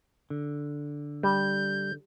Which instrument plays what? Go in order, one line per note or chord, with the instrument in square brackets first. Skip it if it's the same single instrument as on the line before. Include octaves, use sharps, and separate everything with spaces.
[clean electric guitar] D3
[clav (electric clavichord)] G3 [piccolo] G6